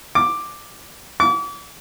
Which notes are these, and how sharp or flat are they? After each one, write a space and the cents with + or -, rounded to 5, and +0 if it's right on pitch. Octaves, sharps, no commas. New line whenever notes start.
D6 +5
D6 -40